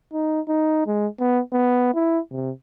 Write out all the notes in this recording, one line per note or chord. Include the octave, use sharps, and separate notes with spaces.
D#4
D#4
G#3
B3
B3
E4
C3